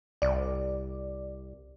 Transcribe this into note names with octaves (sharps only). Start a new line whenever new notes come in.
C2 D5